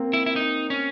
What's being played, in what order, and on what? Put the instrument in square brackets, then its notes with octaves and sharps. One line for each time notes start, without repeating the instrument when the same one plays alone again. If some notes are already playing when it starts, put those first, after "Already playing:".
Already playing: [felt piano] A#3 C4
[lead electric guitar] E4
E4
D#4
C#4